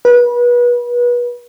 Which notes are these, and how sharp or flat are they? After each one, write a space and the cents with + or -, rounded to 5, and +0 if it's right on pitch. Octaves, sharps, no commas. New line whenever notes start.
B4 -30